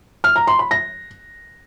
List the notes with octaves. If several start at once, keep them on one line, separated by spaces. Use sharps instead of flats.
F6
A#5
C6
B5
A#6